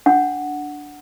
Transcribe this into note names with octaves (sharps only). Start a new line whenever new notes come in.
D4 F#5